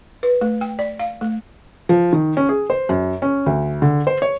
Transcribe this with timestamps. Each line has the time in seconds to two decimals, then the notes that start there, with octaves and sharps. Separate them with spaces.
0.23 B4
0.41 A3
0.61 G5
0.79 D5
0.99 F5
1.21 A3
1.89 F3
2.13 D#3
2.37 C#4
2.49 G#4
2.70 C5
2.89 F#2
3.22 C#4
3.46 D2
3.82 D3
4.07 C5
4.22 C#5